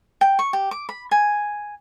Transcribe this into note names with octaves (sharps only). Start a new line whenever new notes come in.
G5
C#6
G4
D6
B5
G#5